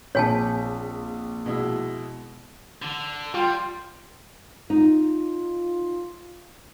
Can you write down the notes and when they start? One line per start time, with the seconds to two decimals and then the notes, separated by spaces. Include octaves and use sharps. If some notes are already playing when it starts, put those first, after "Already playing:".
0.15 A#1 C4 G#4 C#5 G#5 A5 B6
1.46 B2 G#3 E4
2.82 D3
3.34 G3 F4 G5 C6
4.70 D#4 F4